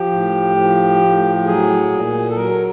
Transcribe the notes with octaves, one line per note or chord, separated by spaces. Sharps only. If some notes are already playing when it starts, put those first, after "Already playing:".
Already playing: F3 G4
A2
F3
A2
F#3 G#4
A#2
A4
F#3 A#4